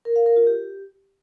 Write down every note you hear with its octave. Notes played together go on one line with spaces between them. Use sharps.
A#4
F5
A#4
F4
G4